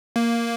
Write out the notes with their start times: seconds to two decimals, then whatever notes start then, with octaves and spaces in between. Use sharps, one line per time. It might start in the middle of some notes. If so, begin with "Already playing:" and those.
0.16 A#3